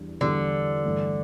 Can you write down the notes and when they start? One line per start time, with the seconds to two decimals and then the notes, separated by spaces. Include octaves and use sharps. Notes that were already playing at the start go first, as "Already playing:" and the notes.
Already playing: E2 E3 G3 D4
0.21 E2 D3 E3 G3 D4
0.84 G2 E3 A3 E4